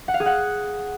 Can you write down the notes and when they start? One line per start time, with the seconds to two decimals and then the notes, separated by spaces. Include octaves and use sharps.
0.08 F#5
0.14 F5
0.20 G#4
0.26 F#5